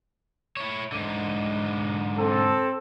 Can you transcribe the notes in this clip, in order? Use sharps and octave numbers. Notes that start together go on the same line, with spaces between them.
E4 C#5
G#2 D3
C4 A4